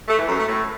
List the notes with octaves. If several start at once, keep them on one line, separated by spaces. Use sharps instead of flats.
A3
E3
F#2
A3
A2